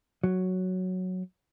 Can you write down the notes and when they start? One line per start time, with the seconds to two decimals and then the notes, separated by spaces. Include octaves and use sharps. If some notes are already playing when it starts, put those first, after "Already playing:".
0.24 F#3